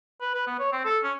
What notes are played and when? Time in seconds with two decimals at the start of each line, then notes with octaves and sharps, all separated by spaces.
0.21 B4
0.34 B4
0.47 B3
0.59 C#5
0.72 C4
0.85 A4
1.03 C#4